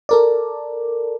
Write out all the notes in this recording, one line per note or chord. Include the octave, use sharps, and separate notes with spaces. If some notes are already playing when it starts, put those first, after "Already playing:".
A4 A#4 D5